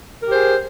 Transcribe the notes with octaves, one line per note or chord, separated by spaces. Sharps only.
G4 G#4 A#4 C5